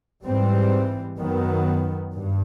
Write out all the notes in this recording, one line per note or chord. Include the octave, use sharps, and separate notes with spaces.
G#2 E3 G3 C4
F#2 D#3 F#3 B3
G2